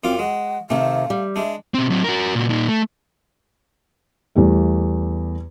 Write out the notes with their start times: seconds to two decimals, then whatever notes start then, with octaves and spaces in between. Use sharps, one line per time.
0.04 F#2 C4 F4 D6
0.19 G#3 F#5
0.70 C3 D#3 A3 C4 F5
1.10 G3
1.36 G#3 D4 E5
1.74 B2 C4
1.90 F#3 C4
2.04 F#4 A#4
2.35 A#2 F#4
2.49 A#2 D#4
2.68 A3
4.35 E2 G3 A3